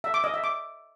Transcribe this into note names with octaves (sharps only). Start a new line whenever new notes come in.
E5
D6
D#5
E5
D6